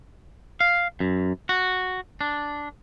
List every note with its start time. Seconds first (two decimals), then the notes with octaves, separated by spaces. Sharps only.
0.61 F5
1.00 F#2
1.49 F#4
2.21 D4